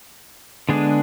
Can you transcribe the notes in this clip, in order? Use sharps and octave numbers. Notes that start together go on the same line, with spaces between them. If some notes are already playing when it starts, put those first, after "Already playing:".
D3 G#3 B3 D4 G#4